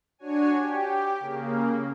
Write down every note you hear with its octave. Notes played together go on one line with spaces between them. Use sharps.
D4 F#4 C#5 G#5
G4
C#3 A#3